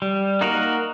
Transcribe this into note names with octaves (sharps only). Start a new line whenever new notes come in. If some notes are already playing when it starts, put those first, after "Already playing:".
G3
A#3 D#4 F#4 A#4